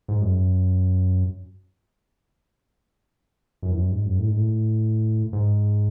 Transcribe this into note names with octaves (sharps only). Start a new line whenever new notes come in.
G#2
F#2
F#2
E2
F#2
G#2
F#2
A2
G#2
A2
G#2